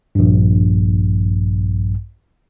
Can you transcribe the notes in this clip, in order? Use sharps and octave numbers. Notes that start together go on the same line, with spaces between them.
A#1 G2